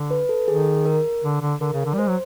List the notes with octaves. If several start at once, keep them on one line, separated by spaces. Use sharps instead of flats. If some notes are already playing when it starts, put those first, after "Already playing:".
Already playing: D3
B4
A4
D#3 G#4
A#4
D3
D3
D3 A#4
C#3
D3
G3
G#3 C5
F#3